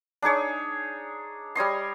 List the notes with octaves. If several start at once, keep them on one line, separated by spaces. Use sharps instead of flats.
D4 D#4 G#4 C#5
G3 C#5 D#5 C6